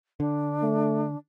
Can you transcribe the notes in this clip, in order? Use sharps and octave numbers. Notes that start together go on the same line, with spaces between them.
D3 D4
A3